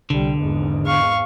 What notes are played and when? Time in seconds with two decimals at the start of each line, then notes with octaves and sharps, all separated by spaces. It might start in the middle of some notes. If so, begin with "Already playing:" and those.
0.10 C2 D3 G3
0.40 G#1 E2 G#2
0.86 F5 C#6